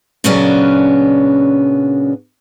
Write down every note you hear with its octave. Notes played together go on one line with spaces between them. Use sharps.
A#2 C#3 F#3 B3 C#4 D4